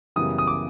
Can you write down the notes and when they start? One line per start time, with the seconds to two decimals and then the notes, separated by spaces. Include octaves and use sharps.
0.16 F#2 C#3 E3 G3 B3 D#6
0.38 D#6
0.47 D6